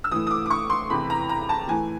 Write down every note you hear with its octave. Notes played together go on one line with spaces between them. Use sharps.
E6
A2 E3 D#6
D#6
D6
D6
C#6
C6
E2 C3 E3 B5
A#5
A#5
A5
A2 E3 G#5